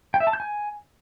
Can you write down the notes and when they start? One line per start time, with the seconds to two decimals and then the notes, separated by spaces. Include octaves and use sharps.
0.14 G5
0.20 E5
0.27 A5
0.33 G6
0.40 G#5